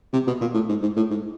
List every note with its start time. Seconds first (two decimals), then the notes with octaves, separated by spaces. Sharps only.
0.13 C3
0.27 B2
0.41 A#2
0.54 A2
0.69 G#2
0.82 G#2
0.97 A2
1.11 G#2